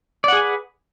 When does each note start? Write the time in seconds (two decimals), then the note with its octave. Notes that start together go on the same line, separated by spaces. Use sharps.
0.24 D5
0.28 F#5
0.33 G#4
0.37 G#5
0.41 B4